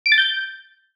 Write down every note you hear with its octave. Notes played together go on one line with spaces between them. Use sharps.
D7
A6
G6